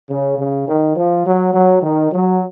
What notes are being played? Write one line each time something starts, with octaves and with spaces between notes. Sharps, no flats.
C#3
C#3
D#3
F3
F#3
F#3
D#3
F#3